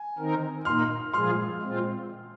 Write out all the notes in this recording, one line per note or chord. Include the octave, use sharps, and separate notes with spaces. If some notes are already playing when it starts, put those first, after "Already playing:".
Already playing: G#5
D#3 C4 D#4 A#4
A#2 A#3 D#4 C6 F6
A#2 F3 G#3 F4 G#4 C6 F6
A#2 G#3 C4 F4